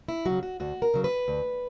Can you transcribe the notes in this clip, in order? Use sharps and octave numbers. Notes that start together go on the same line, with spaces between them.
E4
C#3 F#3 F#4
F#4
D2 F#4
A#4
C#3 F#3
B4
D2